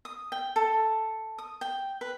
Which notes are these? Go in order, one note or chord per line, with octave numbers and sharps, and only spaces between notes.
D#6
G5
A4
D#6
G5
B4